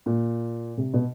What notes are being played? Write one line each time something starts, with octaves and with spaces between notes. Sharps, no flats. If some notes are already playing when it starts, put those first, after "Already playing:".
A#2
C3
B2